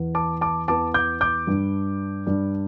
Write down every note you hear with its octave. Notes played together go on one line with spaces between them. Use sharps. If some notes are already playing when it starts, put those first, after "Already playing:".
Already playing: E2 E3 B3
A5 D6
A5 D6
E2 E3 B3 A5 D6
D6 G6
D6 G6
G2 G3 D4
G2 G3 D4